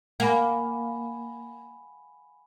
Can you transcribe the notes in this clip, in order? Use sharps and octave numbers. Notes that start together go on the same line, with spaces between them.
A#3 F#5 G#5 B5